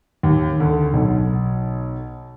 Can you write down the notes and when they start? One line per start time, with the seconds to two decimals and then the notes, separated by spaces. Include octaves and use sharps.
0.23 D#2
0.60 D2
0.93 B1